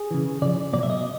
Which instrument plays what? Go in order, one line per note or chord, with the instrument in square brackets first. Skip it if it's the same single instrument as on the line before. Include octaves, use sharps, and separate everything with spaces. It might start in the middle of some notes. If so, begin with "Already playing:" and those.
Already playing: [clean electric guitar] G#4
C#3 E3
C#3 F3 D5
B2 F#3 D5
E5
D#5